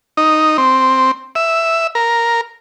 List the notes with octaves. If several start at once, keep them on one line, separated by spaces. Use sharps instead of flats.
D#4
C4
E5
A#4